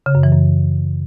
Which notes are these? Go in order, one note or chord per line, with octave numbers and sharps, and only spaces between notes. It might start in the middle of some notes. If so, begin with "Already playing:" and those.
C#3
F#2
E3
F#2